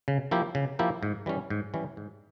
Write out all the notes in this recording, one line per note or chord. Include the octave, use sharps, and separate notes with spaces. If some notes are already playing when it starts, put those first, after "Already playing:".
C#3
F3 A#3 E4 G4
C#3
F3 A#3 E4 G4
G#2
E3 G3 C#4
G#2
E3 G3 C#4
G#2